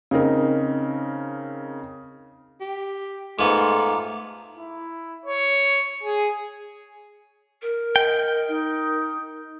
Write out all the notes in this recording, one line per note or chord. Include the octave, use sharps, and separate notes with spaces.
C#3 C4 D#4 A#4
G4
G#2 A3 B3 F4 A#5 D6
E4
C#5
G#4
A#4
D#5 G5
D#4